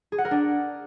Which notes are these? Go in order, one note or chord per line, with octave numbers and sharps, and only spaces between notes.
G#4
F#5
A#4
D4